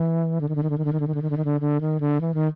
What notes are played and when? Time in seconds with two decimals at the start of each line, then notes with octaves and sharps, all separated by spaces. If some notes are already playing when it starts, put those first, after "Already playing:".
Already playing: E3
0.41 D3
0.49 D#3
0.55 D3
0.63 D#3
0.70 D3
0.78 D#3
0.85 D3
0.93 D#3
1.00 D3
1.07 D#3
1.14 D3
1.22 D#3
1.30 D3
1.37 D#3
1.45 D3
1.61 D3
1.81 D#3
2.00 D3
2.21 E3
2.34 D#3